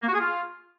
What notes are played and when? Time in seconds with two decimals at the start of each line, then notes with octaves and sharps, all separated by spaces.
0.03 A#3
0.08 F#4
0.14 G#4
0.20 F4